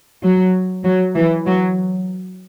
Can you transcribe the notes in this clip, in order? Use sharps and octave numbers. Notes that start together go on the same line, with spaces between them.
F#3
F#3
E3
F#3